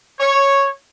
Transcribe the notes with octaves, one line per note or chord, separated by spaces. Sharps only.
C#5